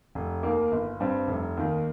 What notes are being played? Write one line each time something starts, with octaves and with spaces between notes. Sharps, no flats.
F1
D#2 D#3 A#3
G1
G2 G3 C4
F1
D#2 D#3